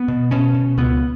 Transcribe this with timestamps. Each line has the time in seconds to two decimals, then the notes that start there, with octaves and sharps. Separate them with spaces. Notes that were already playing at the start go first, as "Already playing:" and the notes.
Already playing: B3
0.08 B2
0.31 B2 C#4
0.54 B2
0.78 C#2 B3